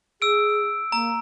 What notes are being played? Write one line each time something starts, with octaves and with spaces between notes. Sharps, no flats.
G#4 E6 D7
A#3 A#5